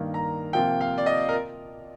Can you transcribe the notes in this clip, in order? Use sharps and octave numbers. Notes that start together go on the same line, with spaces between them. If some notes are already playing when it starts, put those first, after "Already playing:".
Already playing: G2 D#3 A#3
A#5
C3 F3 A#3 F4 G5
F5
D5
D#5
A#4